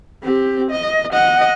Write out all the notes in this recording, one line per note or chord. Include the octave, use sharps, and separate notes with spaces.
C4 G4
D#5
D#5 F#5